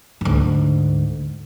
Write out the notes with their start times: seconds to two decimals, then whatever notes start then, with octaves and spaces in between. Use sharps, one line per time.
0.21 D2 G#2